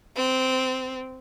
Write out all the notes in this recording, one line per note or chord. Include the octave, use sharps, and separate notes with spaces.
C4